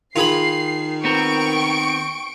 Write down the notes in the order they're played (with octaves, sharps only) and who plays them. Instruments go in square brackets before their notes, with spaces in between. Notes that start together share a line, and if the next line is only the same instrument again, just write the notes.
[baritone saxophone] D#3 [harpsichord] F4 G#4 B5 [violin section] C7
[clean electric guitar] B3 C4 A#4 [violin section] G5 C#6 D7